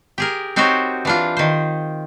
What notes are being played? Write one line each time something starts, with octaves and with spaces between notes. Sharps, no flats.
G4 G#4 A#4
C4 D#4 F#4 G4 C5 C#5
E3 D4 F4
D#3 C5